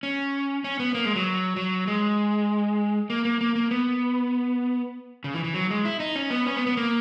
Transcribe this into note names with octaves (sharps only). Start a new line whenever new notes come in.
C#4
C#4
B3
A#3
G#3
F#3
F#3
G#3
A#3
A#3
A#3
A#3
B3
C#3
E3
E3
F#3
G#3
E4
D#4
C#4
B3
C#4
B3
B3
A#3